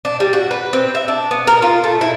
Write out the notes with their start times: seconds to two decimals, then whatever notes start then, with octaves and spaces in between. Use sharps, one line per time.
0.05 D4
0.20 G3
0.33 F#4
0.51 B4
0.73 C4
0.95 E5
1.08 D4
1.31 B3
1.47 A#4
1.62 F4
1.84 A3
2.01 E4